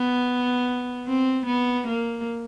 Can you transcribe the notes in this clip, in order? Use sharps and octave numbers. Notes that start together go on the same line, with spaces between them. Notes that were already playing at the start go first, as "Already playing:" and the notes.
Already playing: B3
C4
B3
A#3